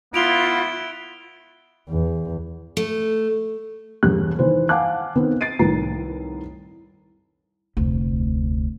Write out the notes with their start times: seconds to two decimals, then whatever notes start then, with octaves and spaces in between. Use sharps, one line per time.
0.14 B3 E4 F4 D7 F7 G7
1.89 E2
2.77 A3
4.03 E1 G2 G4 F#6
4.39 D#3 E3 C5
4.69 F5 F#5 G#5 A5 D6 F#6
5.15 D#3 B3 C4
5.41 A6 C7 D7 D#7
5.59 C2 A2 D#3 B4 A#5 C7
7.77 F1 D2